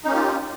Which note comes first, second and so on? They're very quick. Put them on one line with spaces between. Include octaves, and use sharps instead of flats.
D#4 C#4 A#3 G4 F4